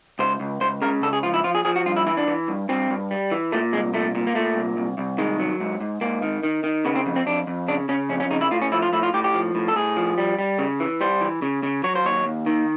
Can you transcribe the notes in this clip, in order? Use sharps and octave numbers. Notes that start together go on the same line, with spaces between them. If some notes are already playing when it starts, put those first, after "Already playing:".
C#2 C5
C#2
C#2 C5
C#3 A#4
C#2 A4
G#4
F3 F4
E4
F3 F4
G#4
F3 G#4
F#4
G2 F4
E4
E3 E4
D4
E3
G2
G2 C4
G2
G3
E3
A#2 A3
C2 G#3
A#2 A3
A#2
A#3
A#2 A3
C2
C2
C2
D#3 G#3
F#3
G#2
G#2
G#2 A#3
D#3
D#3
D#3
C#3 B3
C4
F2
C4
F2 D4
F2
C#3 D4
C#3 C#4
F2 C#4
C#4
C#3 D#4
E4
A2 F4
C#4
F3 E4
F4
A2 E4
F4
A2 G4
G4
F3
A2
A4
A2 G#4
F3
G3
G3
C#3
E3
G3 C5
E3
C#3
C#3
F#3 C#5
C5
D#2 C#5
D#2
D#3